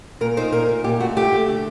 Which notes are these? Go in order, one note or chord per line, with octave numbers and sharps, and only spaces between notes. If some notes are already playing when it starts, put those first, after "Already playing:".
A#2 A#4
D#4 C5
A#2 A#4
D#4
A#2 G4
A3 F#4
A3 G4
A3
D3